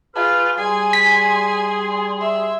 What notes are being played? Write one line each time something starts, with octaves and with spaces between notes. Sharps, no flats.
F4 G#4 B4 F6
G3 G#4 G#5 C6
B6
E5